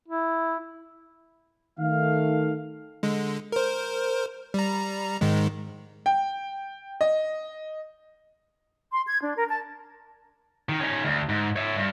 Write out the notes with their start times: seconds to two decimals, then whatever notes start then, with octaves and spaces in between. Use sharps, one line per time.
0.08 E4
1.79 D#3 A3 F5
3.03 D3 G#3
3.52 A#4 C5
4.54 G3 A#5
5.21 G#2 D#3 G#3
6.06 G5
7.01 D#5
8.91 C6
9.07 G#6
9.21 D4
9.36 A#4
9.49 A5
10.69 D#3
10.80 C#4 D#4
11.05 D2
11.29 G#2
11.56 C#5 E5
11.77 G2